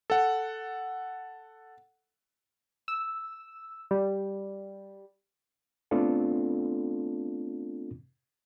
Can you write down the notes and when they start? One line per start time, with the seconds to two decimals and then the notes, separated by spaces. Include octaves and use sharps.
0.10 A4 F#5
2.88 E6
3.91 G3
5.91 A3 B3 C4 D4 F4 A4